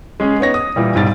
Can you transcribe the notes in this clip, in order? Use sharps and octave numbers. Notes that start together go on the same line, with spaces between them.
G#3 C#4 G#4
B3 D#4 C#5 A#6
D#6
A#2 E3 G3
B1 G#2 G3 A6